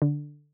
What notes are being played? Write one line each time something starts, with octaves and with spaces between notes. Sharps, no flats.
D3